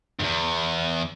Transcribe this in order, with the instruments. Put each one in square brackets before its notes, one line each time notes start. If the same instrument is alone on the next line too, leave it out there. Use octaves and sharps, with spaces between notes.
[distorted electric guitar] E2 G2